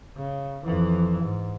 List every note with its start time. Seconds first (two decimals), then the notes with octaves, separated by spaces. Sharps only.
0.17 C#3
0.65 F2 E3
1.24 G#2